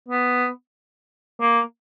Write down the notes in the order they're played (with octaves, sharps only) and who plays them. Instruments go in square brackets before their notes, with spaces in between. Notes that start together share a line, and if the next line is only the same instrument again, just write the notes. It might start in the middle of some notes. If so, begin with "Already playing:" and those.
[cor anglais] B3
A#3